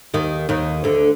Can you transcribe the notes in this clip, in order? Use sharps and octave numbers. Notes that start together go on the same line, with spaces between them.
D#2 D#3
D#2 D#3
D2 D3